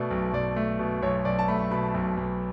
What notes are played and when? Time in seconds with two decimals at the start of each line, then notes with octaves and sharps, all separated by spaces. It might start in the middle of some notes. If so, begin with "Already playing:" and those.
Already playing: B2 A3 D5
0.11 B1
0.33 B1 D5
0.56 A3
0.79 B2
1.02 B1 C#5
1.25 B1 D5
1.39 A5
1.48 A3 B5
1.71 B2 B5
1.94 B1
2.17 B1